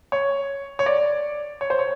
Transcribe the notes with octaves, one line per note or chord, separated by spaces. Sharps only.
C#5
C#5
D5
C#5
C5
C#5